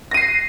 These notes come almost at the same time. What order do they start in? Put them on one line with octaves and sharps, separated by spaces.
A#6 D#7 C7